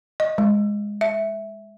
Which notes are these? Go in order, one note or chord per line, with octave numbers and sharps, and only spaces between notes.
D#5
G#3
E5